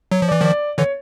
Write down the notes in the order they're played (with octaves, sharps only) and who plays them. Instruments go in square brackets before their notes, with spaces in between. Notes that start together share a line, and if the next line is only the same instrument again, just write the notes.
[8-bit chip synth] F#3 [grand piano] C#5
[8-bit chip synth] F3
[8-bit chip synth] E3 [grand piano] D5
[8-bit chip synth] D#3 F3 [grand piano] D5
[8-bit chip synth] D3 E3 [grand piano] C#5